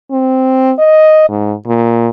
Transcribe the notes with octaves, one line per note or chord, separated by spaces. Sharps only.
C4
D#5
G#2
A#2